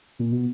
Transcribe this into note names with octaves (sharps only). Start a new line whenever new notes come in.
A#2
B2